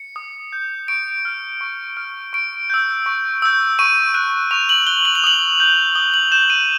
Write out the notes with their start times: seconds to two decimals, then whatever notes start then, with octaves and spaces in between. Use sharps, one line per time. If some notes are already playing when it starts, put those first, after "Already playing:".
Already playing: C#7
0.16 D#6
0.53 G6
0.88 C#6 D7
1.25 F6
1.61 C#6
1.97 F6
2.33 C#6 D7
2.70 E6 G6
3.06 C#6
3.42 E6 G6
3.79 C#6 D#7
4.14 F#6 D#7
4.51 C#6 F7
4.69 F#7
4.87 F#6 G7
5.05 F#7
5.15 F7
5.24 D#6 F#7
5.60 G6
5.95 D#6 G7
6.14 F#7
6.31 G6 E7
6.50 D#7